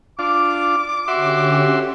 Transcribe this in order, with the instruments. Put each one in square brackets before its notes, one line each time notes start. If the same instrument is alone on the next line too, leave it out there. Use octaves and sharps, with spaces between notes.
[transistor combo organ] D4 F4 [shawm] D6
[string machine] D3 C#4 G4 [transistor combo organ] F#4 E5 C6